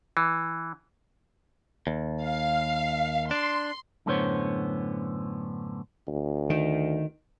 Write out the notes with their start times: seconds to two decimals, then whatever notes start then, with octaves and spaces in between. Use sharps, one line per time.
0.17 E3
1.87 D#2
2.24 F5
3.31 D4 C6
4.06 F#2 A2 D3 B3 C5 C#5
6.08 D2
6.50 D#3